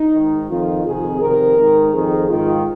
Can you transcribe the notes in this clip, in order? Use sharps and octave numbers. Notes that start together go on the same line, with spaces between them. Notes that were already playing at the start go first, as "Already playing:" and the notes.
Already playing: D#4
G#2 D#3
F2 D#3 F4
F2 C3 D#3 G#4
F2 C3 D#3 A#4
G#2 D#3
F2 D#3 G#4
G#2 D#3 F4